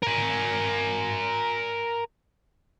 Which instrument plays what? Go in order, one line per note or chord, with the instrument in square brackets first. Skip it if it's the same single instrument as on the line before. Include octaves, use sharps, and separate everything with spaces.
[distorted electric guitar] A#4 G#5